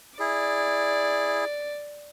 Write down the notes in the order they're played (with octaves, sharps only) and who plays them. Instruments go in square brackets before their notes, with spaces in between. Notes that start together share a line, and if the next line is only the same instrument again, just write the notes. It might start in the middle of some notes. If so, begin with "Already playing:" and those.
[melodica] E4 G#4 [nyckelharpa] D5